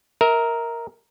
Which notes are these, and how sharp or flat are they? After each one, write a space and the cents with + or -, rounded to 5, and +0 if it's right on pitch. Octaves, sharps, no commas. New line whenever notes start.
A#4 +0 E5 -35